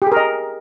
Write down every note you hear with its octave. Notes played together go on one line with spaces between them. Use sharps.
G4 G#4 A#4 D#5